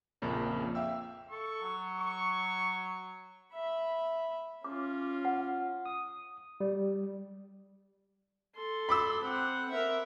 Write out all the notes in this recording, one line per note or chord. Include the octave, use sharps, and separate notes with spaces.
A#1 F2 C#3 A#3 C#4
E5 F5 G5 E6
A4 C#6
F#3
C#6
E5 B5
C#4 F4 D6
F#5
D#6
G3
A4 C6
B5 D6 E6
C4 F#5
A#4 E5